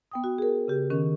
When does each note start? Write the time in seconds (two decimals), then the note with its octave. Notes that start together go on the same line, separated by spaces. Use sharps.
0.11 B3 G5 D#6
0.24 F#4
0.38 G#4 A#4
0.68 C#3 G4
0.90 D#3 C#4 A#4